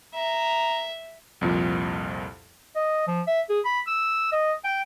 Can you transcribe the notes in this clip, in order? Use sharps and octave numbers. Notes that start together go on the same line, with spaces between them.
E5 A#5
C2 F2 A#2 F3
D#5
F3
E5
G#4
B5
E6
D#5
G5